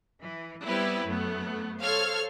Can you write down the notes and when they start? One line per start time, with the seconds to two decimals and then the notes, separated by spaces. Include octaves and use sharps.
0.21 E3
0.64 G3 B3 C4 E4 G4 B4
1.05 F#2 A3 B3
1.80 A4 C5 C#5 F5 F6 G#6